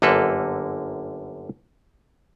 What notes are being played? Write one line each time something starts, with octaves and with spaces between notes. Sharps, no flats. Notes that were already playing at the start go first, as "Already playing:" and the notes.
G1 F#2 D3 A#3 A4 B4